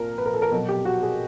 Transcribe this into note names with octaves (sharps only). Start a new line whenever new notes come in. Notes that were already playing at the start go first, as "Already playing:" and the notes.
Already playing: A#2 F3 A#4
B4
A#4
A4
A#4
B2 F#3 A4
G4
F#4
G#4